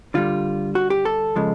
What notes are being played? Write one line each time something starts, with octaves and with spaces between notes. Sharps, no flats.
D3 G3 F4
F#4
G4
A4
C#3 F3 G#3